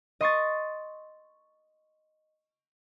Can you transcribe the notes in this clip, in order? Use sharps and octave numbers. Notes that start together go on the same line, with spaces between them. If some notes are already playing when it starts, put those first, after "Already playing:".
D#5 C6 C#6 A6